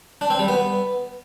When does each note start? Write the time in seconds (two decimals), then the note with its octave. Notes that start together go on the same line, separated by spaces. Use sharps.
0.21 D4
0.30 C4
0.39 G3
0.48 B3